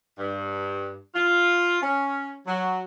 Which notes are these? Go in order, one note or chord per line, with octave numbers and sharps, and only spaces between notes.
G2
F4
C#4
F#3